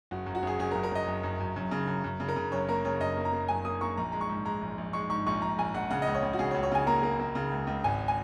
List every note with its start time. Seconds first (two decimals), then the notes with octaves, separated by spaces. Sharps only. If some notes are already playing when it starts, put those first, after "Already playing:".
0.11 F#1 F#4
0.26 F#2
0.35 F#4
0.43 F#1 G#4
0.59 F#1 G#4
0.71 A#4
0.75 F#1
0.83 A#4
0.91 F#1 D#5
1.08 F#1
1.23 F#2
1.40 F#2
1.56 F#2
1.71 C#3
1.88 F#2
2.04 F#2
2.20 C#3
2.28 A#4
2.36 C#3
2.52 F#1 C#5
2.69 A#3 A#4
2.85 C#3 C#5
3.00 F#2 D#5
3.17 A#3
3.25 A#5
3.33 A#3
3.48 F#1 G#5
3.65 A#3 D#6
3.81 A#3 C#6
3.97 A#1 A#5
4.12 G#3 A#5
4.21 C#6
4.29 G#2
4.45 G#3 A#5
4.61 A#1
4.78 A#1
4.93 G#3 C#6
5.10 G#2 C#6
5.26 A#1 C#6
5.42 A#1 A#5
5.58 A#1 G#5
5.74 A#1 F#5
5.90 C#3 F#5
6.02 C#2 D#5
6.14 C#5
6.22 C#2
6.33 F#4
6.39 C#3 G#4
6.51 C#5
6.54 C#2
6.63 C#5
6.72 C#3 G#5
6.87 A#3 A#5
7.03 A#3
7.20 A#3
7.35 C#3
7.51 C#2
7.67 C#2
7.84 G#1 G#5
8.08 G#5